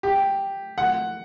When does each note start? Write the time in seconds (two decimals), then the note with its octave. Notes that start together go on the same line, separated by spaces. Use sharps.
0.03 G4
0.78 F#5